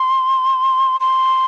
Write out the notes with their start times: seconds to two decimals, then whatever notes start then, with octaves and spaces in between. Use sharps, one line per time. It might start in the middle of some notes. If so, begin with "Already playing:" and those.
Already playing: C6
1.00 C6